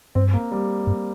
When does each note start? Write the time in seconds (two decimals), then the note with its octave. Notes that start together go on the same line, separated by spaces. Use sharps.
0.15 G2 C4
0.33 A#3
0.52 G3
0.87 G2